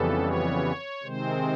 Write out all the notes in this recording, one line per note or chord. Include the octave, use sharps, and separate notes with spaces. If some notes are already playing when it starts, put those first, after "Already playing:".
Already playing: F2 C#3 E3 G3 B3 A4
C#5
C3 D#3 G#3 C4 C5